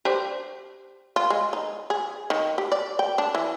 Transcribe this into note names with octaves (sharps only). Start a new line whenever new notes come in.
G4 C5 D5
F4
G#3
D#4
G#4
D#3
G4
D5
G5
D4
E3